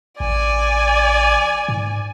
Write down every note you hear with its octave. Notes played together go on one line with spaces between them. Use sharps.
A1 D5 G#5
G#2